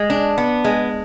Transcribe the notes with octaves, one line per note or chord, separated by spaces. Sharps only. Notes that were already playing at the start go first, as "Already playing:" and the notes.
Already playing: G#3
D4
B3
G#3